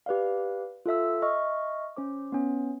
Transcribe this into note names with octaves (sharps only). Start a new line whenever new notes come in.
G4 B4 D5 F5
F4 A4 E5 E6
D#5 E5 C#6 F6
C#4 C5 D6
B3 C#4